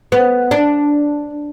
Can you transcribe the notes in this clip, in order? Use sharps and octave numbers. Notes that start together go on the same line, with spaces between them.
B3
D4